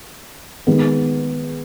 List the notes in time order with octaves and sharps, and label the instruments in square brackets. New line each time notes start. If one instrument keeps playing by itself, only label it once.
[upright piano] D#3 G#3 B3